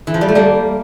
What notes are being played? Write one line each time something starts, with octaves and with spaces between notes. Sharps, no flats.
E3
F3
G3
A3
G3 A#3